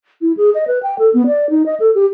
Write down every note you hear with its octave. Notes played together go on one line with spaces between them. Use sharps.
E4
G#4
D#5
B4
G5
A4
B3
D5
D#4
D#5
A4
G4